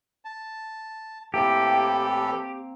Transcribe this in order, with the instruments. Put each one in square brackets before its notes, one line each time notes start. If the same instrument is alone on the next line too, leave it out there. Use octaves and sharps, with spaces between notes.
[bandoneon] A5
[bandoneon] A2 E3 A4 [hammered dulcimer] A#3 C4 [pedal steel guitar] G4